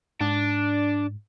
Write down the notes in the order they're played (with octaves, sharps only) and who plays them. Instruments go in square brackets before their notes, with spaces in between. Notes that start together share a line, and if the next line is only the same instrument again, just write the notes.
[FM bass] G#2 [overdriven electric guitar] D4